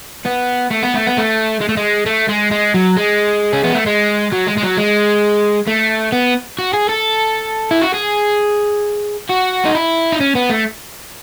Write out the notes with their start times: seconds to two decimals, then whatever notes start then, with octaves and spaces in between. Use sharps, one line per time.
0.25 B3
0.70 A3
0.83 B3
0.95 A3
1.07 B3
1.18 A3
1.61 G#3
1.69 A3
1.77 G#3
2.06 A3
2.29 G#3
2.52 G#3
2.74 F#3
2.97 G#3
3.53 C#4
3.64 B3
3.75 A3
3.86 G#3
4.32 F#3
4.47 G#3
4.57 G#3
4.62 F#3
4.77 G#3
5.67 A3
6.12 B3
6.59 F#4
6.73 G#4
6.89 A4
7.71 E4
7.81 F#4
7.94 G#4
9.30 F#4
9.65 D#4
9.75 E4
10.12 D#4
10.21 C#4
10.35 B3
10.50 A3